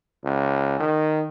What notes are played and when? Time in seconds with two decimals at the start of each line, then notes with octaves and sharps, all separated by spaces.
0.24 C#2
0.80 D#3